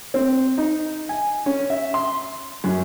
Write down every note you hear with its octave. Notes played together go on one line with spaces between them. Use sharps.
C4
D#4
G#5
C#4
E5
C6
F#2